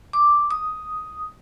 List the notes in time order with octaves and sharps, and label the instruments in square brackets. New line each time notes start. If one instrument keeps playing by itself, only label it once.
[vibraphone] D6
D#6